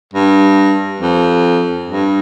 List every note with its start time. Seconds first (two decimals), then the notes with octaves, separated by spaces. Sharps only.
0.14 G2
1.00 F2
1.88 G2